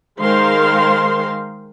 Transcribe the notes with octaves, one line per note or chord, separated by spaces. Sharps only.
D#3 G#3 A#4 C5 F5 C6